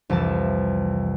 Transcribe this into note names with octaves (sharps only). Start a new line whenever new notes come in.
C2 F2 E3 A5